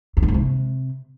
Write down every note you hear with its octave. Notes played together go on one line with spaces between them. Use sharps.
E2
F2
G#2
C3